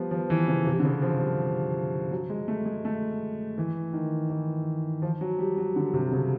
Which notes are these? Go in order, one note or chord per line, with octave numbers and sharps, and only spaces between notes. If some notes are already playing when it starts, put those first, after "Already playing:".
Already playing: F3 G3 B3
F3
E3
C#3
C3
D3
C#3
F3
G3
F#3
G#3
A3
G#3
A3
E3
D#3
E3
F3
F#3
G3
F#3
D3
C3
C#3